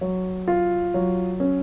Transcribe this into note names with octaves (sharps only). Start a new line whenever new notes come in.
F#3
F4
F#3
C#4